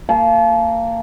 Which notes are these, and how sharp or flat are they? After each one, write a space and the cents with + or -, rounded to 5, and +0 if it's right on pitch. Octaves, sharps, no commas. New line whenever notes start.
A#3 -25 A5 -40